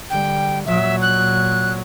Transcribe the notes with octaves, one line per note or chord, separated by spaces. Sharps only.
D3 G3 G5
A#2 F#3 E5
F#6